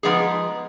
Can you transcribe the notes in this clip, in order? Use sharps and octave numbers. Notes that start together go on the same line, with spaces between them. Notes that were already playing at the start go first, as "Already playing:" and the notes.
F3 G#3 B3 D#4 G#4